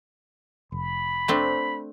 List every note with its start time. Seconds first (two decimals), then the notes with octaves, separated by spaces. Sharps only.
0.72 F1 B5
1.28 A3 C4 D4